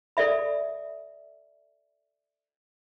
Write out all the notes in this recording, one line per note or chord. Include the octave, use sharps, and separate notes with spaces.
A4 D5 E5 B5